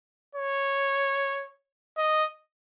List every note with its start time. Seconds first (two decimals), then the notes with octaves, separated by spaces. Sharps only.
0.35 C#5
1.98 D#5